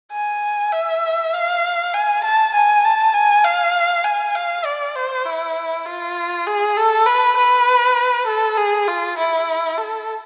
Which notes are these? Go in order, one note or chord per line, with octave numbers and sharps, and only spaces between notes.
G#5
E5
F5
G#5
A5
G#5
A5
G#5
F5
G#5
F5
D5
C5
E4
F4
G#4
A4
B4
B4
A4
G#4
F4
E4
A4